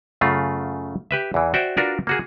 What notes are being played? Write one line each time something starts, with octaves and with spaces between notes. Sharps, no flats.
F#2 C#3 A3 F4
G4 B4 E5
E2 E3
F#4 C5 D5 E5 G5
D4 F4 F#4 A#4 B4 D5
A#3 F#4 G#4